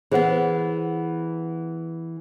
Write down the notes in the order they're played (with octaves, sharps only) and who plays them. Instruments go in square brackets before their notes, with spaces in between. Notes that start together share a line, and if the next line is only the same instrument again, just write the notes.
[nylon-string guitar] E3 B3 [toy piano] G#4 C5 F#5